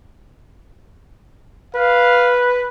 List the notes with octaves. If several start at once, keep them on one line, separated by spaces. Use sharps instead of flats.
B4 F5